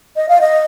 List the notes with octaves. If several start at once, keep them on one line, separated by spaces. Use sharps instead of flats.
D#5
F5
D#5